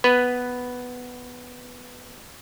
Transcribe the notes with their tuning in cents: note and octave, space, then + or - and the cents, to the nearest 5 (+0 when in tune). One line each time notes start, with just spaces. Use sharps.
B3 +0 B4 +0